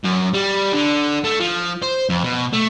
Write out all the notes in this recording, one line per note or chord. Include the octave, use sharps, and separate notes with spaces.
F#2
G3
D3
A3
F3
C5
F2
B2
A3